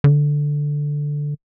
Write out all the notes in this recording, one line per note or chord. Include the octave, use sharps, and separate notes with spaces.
D3